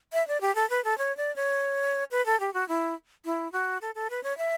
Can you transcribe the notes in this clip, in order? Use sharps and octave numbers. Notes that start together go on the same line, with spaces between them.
E5
D5
G4
A4
B4
A4
C#5
D5
C#5
B4
A4
G4
F#4
E4
E4
F#4
A4
A4
B4
C#5
E5